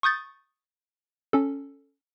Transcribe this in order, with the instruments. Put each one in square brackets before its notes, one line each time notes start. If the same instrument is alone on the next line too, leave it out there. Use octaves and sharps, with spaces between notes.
[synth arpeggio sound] C#6 D#6 G6 A6
C#4 A4